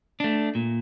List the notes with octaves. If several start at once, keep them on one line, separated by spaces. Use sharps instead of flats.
A3 D4
A#2